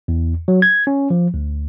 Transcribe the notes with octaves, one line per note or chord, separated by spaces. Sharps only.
E2
F#3
G#6
C#4
F3
D2